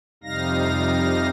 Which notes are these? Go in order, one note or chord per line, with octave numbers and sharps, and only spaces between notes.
F2 C3 G3 D#4 F5 A#6